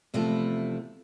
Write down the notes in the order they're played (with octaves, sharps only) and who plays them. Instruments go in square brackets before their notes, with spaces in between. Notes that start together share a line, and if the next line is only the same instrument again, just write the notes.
[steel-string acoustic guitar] E2 C3 F3 A3 E4